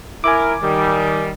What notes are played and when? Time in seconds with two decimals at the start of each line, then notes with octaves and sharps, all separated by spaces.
0.24 E4 A#4 G#5 D6
0.62 D#3 G3